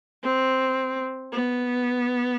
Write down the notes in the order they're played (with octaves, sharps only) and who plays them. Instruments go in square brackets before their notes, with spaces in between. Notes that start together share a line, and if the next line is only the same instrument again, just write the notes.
[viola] C4
B3